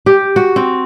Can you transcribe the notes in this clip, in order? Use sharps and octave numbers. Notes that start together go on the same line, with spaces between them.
G4
F#4
C4